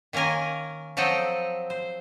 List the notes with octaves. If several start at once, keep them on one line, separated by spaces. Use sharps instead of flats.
D#3 A#3 C#4 A#4 G#5
F3 F#3 C4 A4 D#5 G5
C5